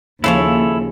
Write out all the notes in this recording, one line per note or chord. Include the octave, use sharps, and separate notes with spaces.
D#2 C#3 F3 E4 A4 C#5 D5